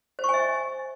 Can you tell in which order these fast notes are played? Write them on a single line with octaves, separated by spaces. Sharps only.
C5 C#6 G#5 E5